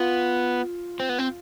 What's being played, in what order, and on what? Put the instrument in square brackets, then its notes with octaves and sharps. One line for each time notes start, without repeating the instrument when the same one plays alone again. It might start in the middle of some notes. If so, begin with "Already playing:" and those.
Already playing: [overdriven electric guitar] B3 [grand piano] F4
[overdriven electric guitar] C4
B3
C4